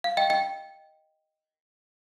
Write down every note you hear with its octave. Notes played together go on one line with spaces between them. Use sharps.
F5
D#5 G5
D#5 G5